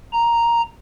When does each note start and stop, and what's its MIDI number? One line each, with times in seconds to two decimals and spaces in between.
0.13 0.61 82